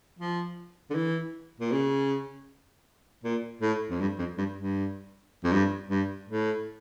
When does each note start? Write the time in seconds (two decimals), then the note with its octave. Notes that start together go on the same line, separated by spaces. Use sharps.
0.19 F3
0.90 D3
0.95 E3
1.60 A#2
1.72 C#3
3.24 A#2
3.62 A2
3.91 F2
4.01 G2
4.19 F2
4.38 G2
4.57 G2
5.44 F2
5.52 G2
5.90 G2
6.29 A2